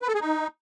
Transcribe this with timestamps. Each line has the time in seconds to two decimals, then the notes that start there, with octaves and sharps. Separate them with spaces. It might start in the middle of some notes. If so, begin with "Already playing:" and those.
0.02 B4
0.08 A4
0.14 G#4
0.21 D#4